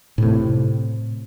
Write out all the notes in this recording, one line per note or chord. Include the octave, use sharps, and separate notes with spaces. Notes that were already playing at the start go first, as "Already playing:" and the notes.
A2 C3